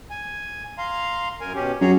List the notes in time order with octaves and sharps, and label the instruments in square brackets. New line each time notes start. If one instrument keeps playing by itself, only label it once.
[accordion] G#5
F5 A#5 C6
F#2 A#4 G#5
B2 C#4 G4
[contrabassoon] F#2 [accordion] G#4 C#5 A#5